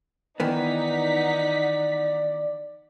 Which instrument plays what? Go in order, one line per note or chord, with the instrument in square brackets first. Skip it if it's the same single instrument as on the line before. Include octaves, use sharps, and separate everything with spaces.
[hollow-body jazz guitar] D#3 E3 B3 [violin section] D#4 F#5 B6 [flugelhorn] D5